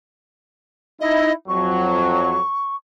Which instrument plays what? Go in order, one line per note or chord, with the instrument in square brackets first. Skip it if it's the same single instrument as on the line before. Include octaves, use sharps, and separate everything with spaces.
[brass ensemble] D#4 E4 [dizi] D#5
[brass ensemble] F2 F#3 [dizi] C#6